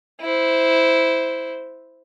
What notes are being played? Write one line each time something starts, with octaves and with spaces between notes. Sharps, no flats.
E4 C5